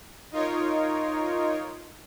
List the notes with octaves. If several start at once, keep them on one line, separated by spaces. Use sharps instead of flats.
D#4 F4 A#4 C#5